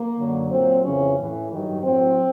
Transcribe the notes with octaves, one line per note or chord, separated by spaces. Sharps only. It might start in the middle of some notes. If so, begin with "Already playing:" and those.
Already playing: A#3
F#2 D3 F#3
A#2 F#3 C4
F2 C#3 E3 C#4
A2 E3
G2 D#3 F#3
A2 F#3 C4